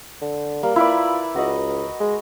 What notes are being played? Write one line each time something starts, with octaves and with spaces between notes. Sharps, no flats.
D3
G3 A#3
E4 F4 B4 D5
C#2 F#4 D#5 F#5
G#3